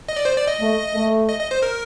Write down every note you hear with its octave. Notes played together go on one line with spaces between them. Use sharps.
D#5
D5
C5
D5
D#5
A3
A3
D#5
D#5
C5
A#4